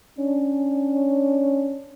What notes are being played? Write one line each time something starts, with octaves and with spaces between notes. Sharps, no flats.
C#4 D4